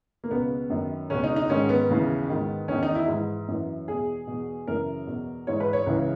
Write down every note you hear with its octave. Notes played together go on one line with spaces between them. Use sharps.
A#3
C#2 B2 B3
F#2 D#3
C#2 B2 C#4
D#4
D#4
G#2 D#3 C#4
B3
D#2 C#3 E3
G#2 D#3
E2 D#3 C#4
D#4
E4
G#2 E3
F#2 E3
E2 B2 G#4
E2 B2
F#2 C#3 E3 A#4
E2 B2
G#2 E3 C#5
B4
C#5
C#2 C#3 E3